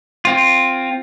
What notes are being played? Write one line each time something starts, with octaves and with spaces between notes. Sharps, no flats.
C4 F4